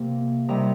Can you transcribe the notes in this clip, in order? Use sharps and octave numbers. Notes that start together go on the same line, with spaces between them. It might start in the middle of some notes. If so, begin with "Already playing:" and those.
Already playing: C3 A#3
C3 D#3 G3 A#5